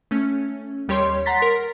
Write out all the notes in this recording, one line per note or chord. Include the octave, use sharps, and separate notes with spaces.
A3 C#4
D#2 G3 G4 C#5 C6
F#5 A#5 C6 A6 B6
A#4